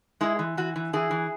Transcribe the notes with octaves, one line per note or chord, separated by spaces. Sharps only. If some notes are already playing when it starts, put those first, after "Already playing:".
G#3 E4 G#4
E3
E3 F#4
E3
E3 E4 G#4
E3